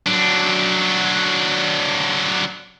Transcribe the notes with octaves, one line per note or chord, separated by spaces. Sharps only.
F#3 D4